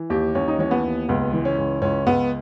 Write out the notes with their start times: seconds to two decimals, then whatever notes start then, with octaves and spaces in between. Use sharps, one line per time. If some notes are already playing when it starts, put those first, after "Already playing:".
Already playing: E3
0.10 D#2 G4
0.35 D#2 C#4
0.48 D#4
0.59 E3 C#4
0.71 B3
0.84 D#2
1.09 C#2 B3
1.33 E3
1.45 C#4
1.58 C#2
1.82 C#2 C#4
2.07 C#2 B3